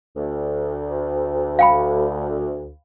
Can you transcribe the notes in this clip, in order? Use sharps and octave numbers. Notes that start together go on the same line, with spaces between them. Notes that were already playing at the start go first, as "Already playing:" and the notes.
D2
F5 G5 B5